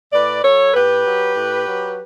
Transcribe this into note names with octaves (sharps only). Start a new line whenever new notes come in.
A2 B4 D5
F#3 A4 C#5
A2 G4 B4
F#3
A2
F#3